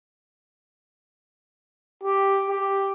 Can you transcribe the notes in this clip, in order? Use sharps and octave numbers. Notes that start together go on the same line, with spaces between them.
G4
G4